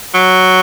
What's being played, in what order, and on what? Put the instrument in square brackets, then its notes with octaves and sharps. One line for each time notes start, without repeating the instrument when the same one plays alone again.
[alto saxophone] F#3